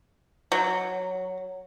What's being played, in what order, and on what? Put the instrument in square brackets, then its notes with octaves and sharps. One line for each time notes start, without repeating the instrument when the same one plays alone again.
[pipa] F#3